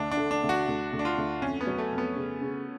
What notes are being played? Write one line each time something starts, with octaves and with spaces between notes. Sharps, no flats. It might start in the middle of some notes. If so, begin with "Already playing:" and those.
Already playing: D2 D4
D4
D3
D4
D2
F#4
D2
D2
D4
F4
D2
F2 C#4
B3
F#3
A3
F2
B3
C#3
C#3